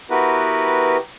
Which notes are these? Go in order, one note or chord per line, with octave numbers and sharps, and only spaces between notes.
B3 E4 F#4 G4 A#4 B4